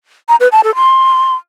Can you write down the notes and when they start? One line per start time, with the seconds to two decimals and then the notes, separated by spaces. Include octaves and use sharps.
0.29 A#5
0.40 B4
0.52 A5
0.64 A4
0.76 C6